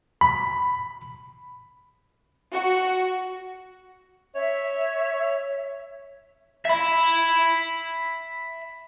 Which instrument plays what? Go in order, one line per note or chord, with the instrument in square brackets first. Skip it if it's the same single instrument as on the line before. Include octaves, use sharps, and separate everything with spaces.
[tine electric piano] B5
[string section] F#4
[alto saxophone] C#5 [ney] E5
[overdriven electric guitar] E5 B5